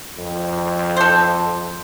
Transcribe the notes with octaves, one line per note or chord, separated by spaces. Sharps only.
F2
A4 C5